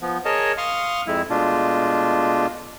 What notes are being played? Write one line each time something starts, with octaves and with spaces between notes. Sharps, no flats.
F3 B3
G#4 A#4 C#5 D#5 A5
F5 C6 C#6 D#6 F6
F2 G#3 E4
B2 G#3 A3 D4 F4